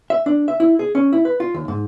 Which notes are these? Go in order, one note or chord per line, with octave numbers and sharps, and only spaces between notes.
E5
D4
E5
E4
G#4
C#4
E4
B4
F4
D#2
G#2